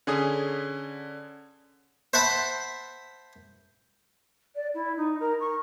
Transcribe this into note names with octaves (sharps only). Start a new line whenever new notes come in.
D3 C#4 G#4 D#6
C5 E5 F#5 A5 B5 C6
D5
E4
D#4
A#4
C#6